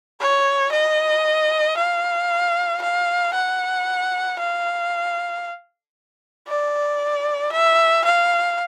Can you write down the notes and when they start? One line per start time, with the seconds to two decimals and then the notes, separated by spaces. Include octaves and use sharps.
0.20 C#5
0.72 D#5
1.77 F5
2.82 F5
3.34 F#5
4.39 F5
6.47 D5
7.52 E5
8.05 F5